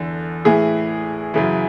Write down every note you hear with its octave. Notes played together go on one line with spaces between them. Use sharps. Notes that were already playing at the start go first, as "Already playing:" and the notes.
Already playing: E2 D3 A4
A2 E3 G#4
F#2 C#3 E3